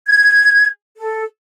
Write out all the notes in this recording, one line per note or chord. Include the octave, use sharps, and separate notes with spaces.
G#6
A4